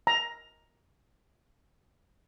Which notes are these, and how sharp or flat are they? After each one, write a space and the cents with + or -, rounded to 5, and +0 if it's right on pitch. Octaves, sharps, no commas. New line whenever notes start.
A#5 +10